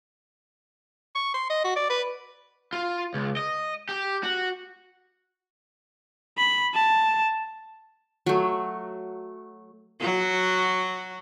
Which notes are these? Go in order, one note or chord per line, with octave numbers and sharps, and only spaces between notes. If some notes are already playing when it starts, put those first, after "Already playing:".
C#6
C6
D#5
F#4
D5
B4
F4
C#2
D#5
G4
F#4
B5
A5
F#3 A3
F#3 F#4